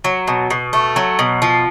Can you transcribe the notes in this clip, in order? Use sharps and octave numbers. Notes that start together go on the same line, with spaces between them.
F#3
B2
B2
A3
F#3
B2
F3